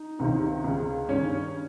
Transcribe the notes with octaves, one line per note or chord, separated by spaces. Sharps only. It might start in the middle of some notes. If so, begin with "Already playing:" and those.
Already playing: D#4
C#2 C3 D#3
C#2 C#3
G2 D#3 C#4 C#5